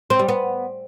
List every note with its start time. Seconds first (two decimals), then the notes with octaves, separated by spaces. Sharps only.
0.10 C4
0.19 G3
0.29 B3